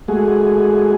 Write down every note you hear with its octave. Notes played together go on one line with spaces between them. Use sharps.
G#3 A3 F#4 G#4